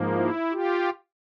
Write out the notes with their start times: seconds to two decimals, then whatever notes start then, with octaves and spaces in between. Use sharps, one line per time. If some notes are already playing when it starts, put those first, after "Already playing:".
Already playing: G#2 F3 A#3
0.15 E4
0.52 F4 G4